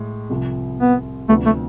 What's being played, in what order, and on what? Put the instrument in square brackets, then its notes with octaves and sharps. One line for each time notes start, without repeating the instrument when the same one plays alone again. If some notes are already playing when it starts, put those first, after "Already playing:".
Already playing: [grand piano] A2 G#3
C2 C3 F3
[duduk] B3
[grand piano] D2 C3 F3 B3 D4 [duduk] A3
[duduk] A3